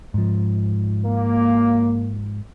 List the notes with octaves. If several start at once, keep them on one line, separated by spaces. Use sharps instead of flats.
G#2 F3
A#3